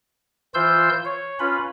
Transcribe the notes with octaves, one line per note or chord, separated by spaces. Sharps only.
E3 F4 C5 C6 E6 G6
C#5
C#4 F4 B4 B5